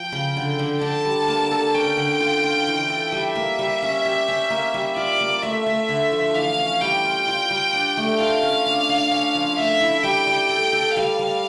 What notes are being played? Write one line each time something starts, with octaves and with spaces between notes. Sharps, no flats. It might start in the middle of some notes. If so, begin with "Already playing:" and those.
Already playing: F3 G5
C#3
D3
D3
D3 A5
G3
A#3
A4
C#4 G5
D3
F4
F4
E3
A4
G3 E5
A#3
G3
C#4
G4
C#4
A#3
G3
F4 D5
A#3
A3 E5
A3
D3
F3
E3 F5
C#4
G3 G5
F4
F4
G3
D4
A3
F4 F5
C#4
D4
D4
C#4
F3
A3 E5
E4
G3 G5
G3
A4
A4
G3 F5
G3